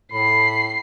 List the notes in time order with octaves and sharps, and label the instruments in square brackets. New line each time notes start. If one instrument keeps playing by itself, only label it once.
[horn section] A2 B5 [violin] C7